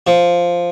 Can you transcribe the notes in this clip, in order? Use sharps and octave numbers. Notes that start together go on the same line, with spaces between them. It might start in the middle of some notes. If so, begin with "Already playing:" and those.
F3